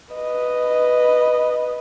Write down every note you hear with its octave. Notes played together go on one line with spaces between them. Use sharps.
B4 D#5